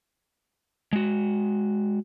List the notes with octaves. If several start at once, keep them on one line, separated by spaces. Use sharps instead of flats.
G#3 F#4